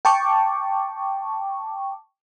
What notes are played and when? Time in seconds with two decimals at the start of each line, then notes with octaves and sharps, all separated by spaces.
0.05 G5 A5 C#6 D6